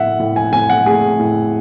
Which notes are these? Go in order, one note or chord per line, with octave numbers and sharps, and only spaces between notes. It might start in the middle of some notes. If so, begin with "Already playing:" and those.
Already playing: A2 A3 E5 F#5
A2
G#5
A2 G#5
F#5
A3 G#4
A2